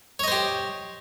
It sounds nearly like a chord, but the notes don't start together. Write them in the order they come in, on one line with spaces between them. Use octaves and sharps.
C#5 D#5 C5 G4